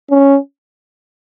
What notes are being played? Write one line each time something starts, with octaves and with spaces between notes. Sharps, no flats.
C#4